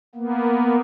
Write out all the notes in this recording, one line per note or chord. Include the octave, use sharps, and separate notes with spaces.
A#3 B3